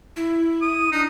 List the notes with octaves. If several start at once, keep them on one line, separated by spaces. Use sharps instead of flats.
E4
D#6
D4 D#4